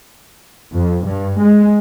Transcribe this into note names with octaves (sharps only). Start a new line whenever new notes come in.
F2
G2
G#3